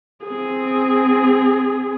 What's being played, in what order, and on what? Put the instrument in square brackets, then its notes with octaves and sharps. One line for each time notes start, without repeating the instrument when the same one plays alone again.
[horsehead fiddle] C4 G#4